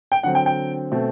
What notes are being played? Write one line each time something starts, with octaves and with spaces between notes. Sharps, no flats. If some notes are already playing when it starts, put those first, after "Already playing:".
G5
D3 F#3 C4 F#5
G5
G5
B2 A3 C4